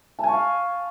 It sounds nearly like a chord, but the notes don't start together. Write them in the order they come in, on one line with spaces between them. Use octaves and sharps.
A5 G#5 C#6 F5